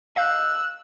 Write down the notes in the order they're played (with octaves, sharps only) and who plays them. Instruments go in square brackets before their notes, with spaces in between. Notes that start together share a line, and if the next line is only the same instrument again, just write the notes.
[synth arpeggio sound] D#5 F5 G6 [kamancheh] E6 F#6